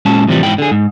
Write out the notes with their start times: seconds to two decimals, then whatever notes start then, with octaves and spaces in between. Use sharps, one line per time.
0.06 A#2 G#3 C#4 A5
0.28 A2 C3 E3 F3 G3
0.43 G#2 E3 B3 G5 B5
0.58 D3 G#4
0.71 G#2